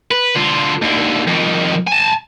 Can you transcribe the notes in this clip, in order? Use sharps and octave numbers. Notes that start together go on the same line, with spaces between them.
B4
D3 F4
D#2 D3
F2 D#3
G#5 A5